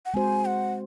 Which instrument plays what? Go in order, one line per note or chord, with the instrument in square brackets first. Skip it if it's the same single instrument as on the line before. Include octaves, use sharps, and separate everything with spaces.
[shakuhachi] F#5
[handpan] G#3 C4 F#4 C5 [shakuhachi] G#5
[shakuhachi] F#5